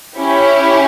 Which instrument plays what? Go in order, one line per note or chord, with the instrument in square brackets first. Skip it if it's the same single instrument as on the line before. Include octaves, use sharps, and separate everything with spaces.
[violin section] C#4 E4 G4